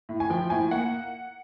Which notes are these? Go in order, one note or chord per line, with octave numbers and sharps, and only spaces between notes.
A2
G#5
F3 G5
A2 G#5
A#3 F#5